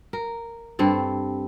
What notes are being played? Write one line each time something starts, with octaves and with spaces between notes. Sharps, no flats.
A#4
G2 C4 A4